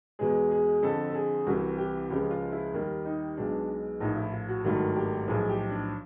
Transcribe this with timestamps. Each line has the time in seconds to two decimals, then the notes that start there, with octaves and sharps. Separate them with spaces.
0.19 E2 B2 G#3 G#4
0.51 G#4
0.83 F2 D3 F3 A4
1.10 A4
1.15 G#4
1.46 C2 C3 E3 F#4
1.78 G4
2.10 C#2 C#3 F3 G#3 G4
2.31 F4
2.52 E4
2.74 D#2 D#3 G3 A#3
3.05 D#4
3.37 B1 B2 G#3 D4
4.00 A#1 A2 F3 D#4
4.16 E4
4.32 F4
4.48 F#4
4.64 G#1 G2 D#3 F#3 A3 F#4
4.96 G4
5.28 B1 A2 F3 G#4
5.49 G4
5.70 D4